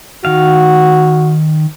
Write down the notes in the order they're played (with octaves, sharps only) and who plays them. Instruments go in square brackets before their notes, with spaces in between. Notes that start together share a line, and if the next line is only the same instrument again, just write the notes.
[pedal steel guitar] D#3 F5 [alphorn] F#4